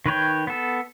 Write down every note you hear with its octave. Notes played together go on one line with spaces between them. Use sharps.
D#3 B4 C#5 G5
B3 A4